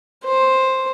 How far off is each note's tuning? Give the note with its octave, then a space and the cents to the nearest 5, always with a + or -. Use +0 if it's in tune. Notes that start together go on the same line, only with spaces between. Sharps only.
C5 +5